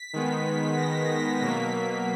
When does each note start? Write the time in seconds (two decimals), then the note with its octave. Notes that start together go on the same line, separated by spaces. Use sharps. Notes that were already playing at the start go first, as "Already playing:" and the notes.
Already playing: B6
0.13 D#3 G#3 B3
0.77 A#6
1.10 A#6
1.42 B2 F#3 A#3 B6